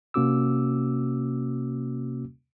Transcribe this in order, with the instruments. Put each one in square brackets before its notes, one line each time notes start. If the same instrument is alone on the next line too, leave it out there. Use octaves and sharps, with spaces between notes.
[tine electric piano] C3 A#3 C#4 F#4 D6 E6